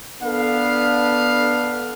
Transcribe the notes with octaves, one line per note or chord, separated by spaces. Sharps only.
B3 D4 A4 B4 F5